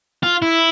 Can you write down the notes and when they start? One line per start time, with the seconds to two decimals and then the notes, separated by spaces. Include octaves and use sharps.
0.23 F4
0.42 E4